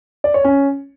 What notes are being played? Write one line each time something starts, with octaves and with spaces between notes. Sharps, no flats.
D5
C#5
C#4